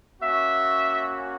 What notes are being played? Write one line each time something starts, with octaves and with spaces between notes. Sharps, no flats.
A#3 C#4 F#4 E5